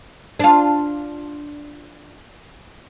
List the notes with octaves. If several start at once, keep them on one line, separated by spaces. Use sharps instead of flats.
D4 F4